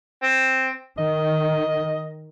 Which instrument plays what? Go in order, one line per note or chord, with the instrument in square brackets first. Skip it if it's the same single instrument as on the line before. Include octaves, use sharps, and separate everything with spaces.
[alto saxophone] C4
[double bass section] D#3 [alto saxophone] D#5